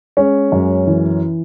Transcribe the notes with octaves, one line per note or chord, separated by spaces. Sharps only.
G#3 C#4
F#2
E3